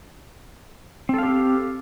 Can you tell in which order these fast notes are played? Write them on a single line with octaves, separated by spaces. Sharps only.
C4 A4 F5 G4